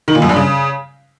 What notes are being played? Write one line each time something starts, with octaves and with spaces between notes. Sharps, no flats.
D#3
A#2
F#2
G2
C#3